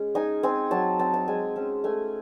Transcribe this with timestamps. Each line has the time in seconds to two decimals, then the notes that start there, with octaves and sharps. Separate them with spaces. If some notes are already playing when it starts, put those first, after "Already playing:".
Already playing: G#3 C#4
0.15 D#4 G#5
0.43 C4 G#5
0.71 F#3 A5
0.99 C4 A5
1.14 A5
1.28 G#3 G#5
1.56 C#4 A5
1.84 A3 G#5